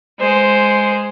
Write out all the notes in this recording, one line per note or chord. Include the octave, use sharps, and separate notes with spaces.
G#3 C5